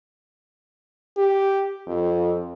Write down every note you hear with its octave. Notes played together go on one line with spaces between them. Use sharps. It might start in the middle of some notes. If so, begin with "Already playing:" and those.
G4
F2